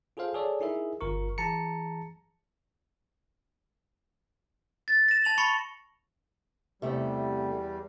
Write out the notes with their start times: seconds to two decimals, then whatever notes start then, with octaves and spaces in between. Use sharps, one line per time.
0.17 F4 G#4 A4 C5 F5
0.34 G#4 A4 C#5 D5
0.61 D#4 E4 G#4 A#4 E5
1.01 G1 F4 A#4 C#6
1.38 E3 G#4 A5 A#5 C#7
4.88 A6
5.08 A#6 E7
5.24 A5 F7 F#7
5.38 A5 B5 C#6 C#7
6.82 E2 C3 G3 A3